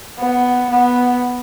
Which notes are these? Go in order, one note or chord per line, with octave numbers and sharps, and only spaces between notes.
B3
B3